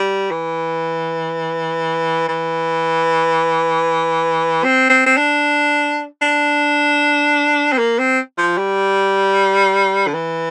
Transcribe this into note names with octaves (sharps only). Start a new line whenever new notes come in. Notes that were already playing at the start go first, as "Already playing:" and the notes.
Already playing: G3
E3
E3
C4
C4
C4
D4
D4
C4
A#3
C4
F3
G3
D3
E3